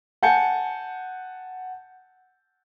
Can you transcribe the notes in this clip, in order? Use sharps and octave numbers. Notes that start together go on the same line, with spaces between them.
F#5 G#5 A5 G6 C#7